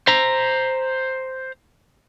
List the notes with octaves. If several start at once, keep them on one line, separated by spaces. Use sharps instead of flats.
C5 A#5